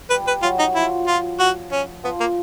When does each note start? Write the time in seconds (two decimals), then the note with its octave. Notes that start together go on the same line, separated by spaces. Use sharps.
0.10 G3 B4
0.27 B4
0.42 F#3 F4
0.59 D#4
0.75 F3 E4
1.07 F4
1.40 F#4
1.72 C#4
2.04 F3 B3
2.20 A#3